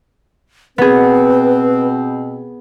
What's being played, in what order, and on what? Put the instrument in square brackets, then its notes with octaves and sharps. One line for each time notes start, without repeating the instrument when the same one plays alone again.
[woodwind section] B2 C4 [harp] B3 G#4 [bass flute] B4